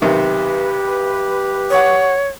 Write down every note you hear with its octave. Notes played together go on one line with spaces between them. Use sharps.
B1 C3 D#3 G4 B4
C#5 F#5 C#6 D#6